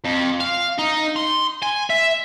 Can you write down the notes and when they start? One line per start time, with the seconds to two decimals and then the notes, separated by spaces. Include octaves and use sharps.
0.04 F2
0.40 F5
0.78 D#4
1.16 C6
1.63 G#5
1.90 E5